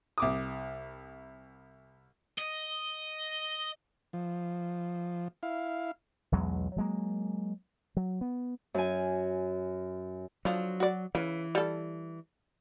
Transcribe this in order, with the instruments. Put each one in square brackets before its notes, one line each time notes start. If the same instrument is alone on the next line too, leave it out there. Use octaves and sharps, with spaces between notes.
[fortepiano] C2 D6 D#6
[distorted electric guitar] D#5
[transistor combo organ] F3
E4 F5
[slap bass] B1 E2 F#3 G#3
F#3 G#3 A#3
F#3
B3
[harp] F#2 G#5
[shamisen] D3 F3 [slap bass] F#3
[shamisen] F#4 D5
[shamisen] C#3 B4 [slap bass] E3
[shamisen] G3 A4